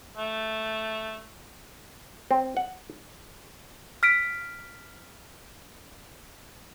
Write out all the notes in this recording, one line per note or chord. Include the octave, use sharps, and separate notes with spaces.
A3
C4
F#5
F6 B6 D7